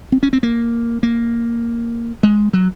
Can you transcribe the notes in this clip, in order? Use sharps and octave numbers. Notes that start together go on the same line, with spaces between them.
C4
C#4
C4
A#3
A#3
G#3
F#3